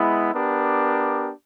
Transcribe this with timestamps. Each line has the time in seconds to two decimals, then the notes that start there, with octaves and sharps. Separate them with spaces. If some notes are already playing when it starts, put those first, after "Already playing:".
Already playing: G#3 B3 E4
0.33 B3 D4 G4 A#4